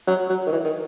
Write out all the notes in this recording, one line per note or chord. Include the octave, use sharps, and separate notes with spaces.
F#3
F#3
D#3
E3
D#3